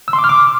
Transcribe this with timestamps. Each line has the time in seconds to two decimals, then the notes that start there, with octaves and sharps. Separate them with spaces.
0.08 E6
0.13 C6
0.19 D6
0.24 F6
0.29 D6